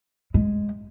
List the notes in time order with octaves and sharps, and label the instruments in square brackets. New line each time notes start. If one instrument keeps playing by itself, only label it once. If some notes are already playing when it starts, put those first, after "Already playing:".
[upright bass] G#3